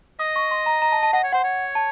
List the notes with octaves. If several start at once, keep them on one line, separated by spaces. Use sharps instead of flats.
D#5 D#6
C#6
C6
A#5
A#5
A5
A5
D#5 F#5
C#5
C5 F#5
C#5
A5